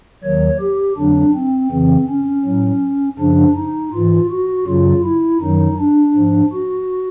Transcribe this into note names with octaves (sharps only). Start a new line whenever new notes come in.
D#2 D#3 F#3 C#5
G4
F2 D3 F#3 D4
C4
F2 C#3 E3 C4
C#4
A2 F#3
F#2 C#3 F3 D4
D#4
G#2 E3 F4
F#4
F#2 C#3 F#3 F4
E4
F#2 D#3 F#3 D#4
D4
G#2 F3
F#4